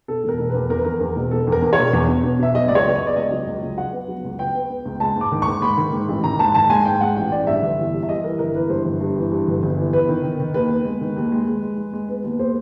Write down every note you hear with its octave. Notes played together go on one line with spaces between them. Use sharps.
B2 A4
E1 A#4
E1
E2 B4
E2 A#4
B4
E2 A#4
E2
E1
B2 A4
E2
A#4
E2
C#5
E1
E2
B2
B2
B2 E5
F#3 D#5
C#2 D5
C#5
B3
D#5
B3
D5
C#2 D#5
F#3
C#2
C#2
F#3 F#5
B3
F#3
C#2
B3 G5
B3
B3
C#2
G#3 A5
G#2 D6
D#3
C#6
G#2
G#2 B5
D#3
G#2
A1
D#3 A#5
G#2 A5
D#3 A5
G#3 G#5
G#2 G5
G#3 F#5
A1 G5
A1 D5
G2 E5
G1
E3
G3
E5
G3 D#5
E3 A#4
G1 A#4
E3 B4
G2 C5
G1
G2
E3
G2
G1
G1
E3
B3 B4
D#3
D#3
D#3
D#2 B4
B3
G#3
D#3
D#2
G#3
G#3
G#3
G#3
G#3
B3
D#2
A#3 C5